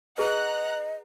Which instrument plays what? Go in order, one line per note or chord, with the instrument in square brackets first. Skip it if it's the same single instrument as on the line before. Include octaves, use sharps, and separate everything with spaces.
[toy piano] G#4 B4 [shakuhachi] D#5 [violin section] F#5 A#5 F#6